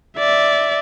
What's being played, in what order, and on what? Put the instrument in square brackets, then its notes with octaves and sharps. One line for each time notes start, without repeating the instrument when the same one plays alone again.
[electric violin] D5 E5